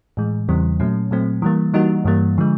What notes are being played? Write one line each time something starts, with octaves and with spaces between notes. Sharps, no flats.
A2 E3 G#3
E2 C#3 E3 G3 C4
A#2 F#3 A3 C#4
A#2 F#3 A3 C4
E3 G3 A#3
E3 G3 A#3 D#4 F#4
G2 E3 G3 A#3
D3 F3 G#3